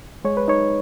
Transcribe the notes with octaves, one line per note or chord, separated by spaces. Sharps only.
G#3 C#5
B4
D#4 C#5